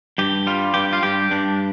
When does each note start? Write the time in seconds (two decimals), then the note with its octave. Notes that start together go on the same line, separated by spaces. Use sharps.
0.18 G2 G4
0.47 G3 F4
0.74 G2 G4
0.93 F4
1.03 G2 G4
1.31 G2 D4